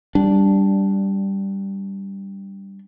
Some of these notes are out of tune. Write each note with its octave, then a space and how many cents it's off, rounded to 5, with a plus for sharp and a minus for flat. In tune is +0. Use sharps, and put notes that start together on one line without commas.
G3 +0 D4 -10